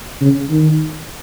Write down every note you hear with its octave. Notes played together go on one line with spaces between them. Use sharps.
C#3
D#3